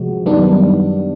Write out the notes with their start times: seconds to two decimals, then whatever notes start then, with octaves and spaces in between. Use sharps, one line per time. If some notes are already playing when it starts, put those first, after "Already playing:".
Already playing: C3 F3 G#3 F#4
0.26 F#2 D#3 G3 B3 D4